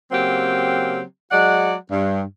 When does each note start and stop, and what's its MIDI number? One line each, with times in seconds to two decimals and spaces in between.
0.12 1.02 49
0.12 1.02 54
0.12 1.02 58
0.12 1.02 60
0.12 1.02 67
1.31 1.74 54
1.31 1.74 56
1.31 1.74 74
1.31 1.74 78
1.90 2.22 43